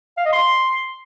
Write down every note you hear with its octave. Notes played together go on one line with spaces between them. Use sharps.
F5
D#5
C6